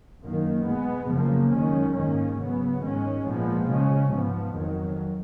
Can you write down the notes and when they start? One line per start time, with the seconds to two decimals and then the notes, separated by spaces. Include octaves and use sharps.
0.22 F#2 D#3 A#3
0.66 B2 G#3 B3
1.09 F#2 C#3 F3 A#3
1.53 F#2 D#3 G#3 C#4
1.96 G#2 D#3 A#3 C#4
2.39 C#3 F#3 B3
2.83 G#2 D#3 G#3 C#4
3.26 A#2 F3 G#3 B3
3.69 C#3 G#3 C#4
4.13 G#2 F3 B3
4.56 F2 D#3 F#3